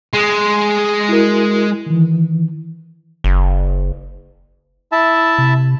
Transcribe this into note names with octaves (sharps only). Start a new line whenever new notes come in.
G#3
E4 F#4 A#4
D#3 E3
F#1
E4 E5 A5
C3